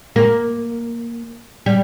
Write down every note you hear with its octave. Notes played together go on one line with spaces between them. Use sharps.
A#3
G3